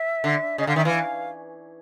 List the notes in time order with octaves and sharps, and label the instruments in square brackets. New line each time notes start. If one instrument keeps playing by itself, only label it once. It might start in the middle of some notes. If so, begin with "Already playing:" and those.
Already playing: [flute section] E5
[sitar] D3
[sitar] C#3 [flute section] D#5
[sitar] D3 [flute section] F5
[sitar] D#3 [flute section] E5
[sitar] E3 [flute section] F5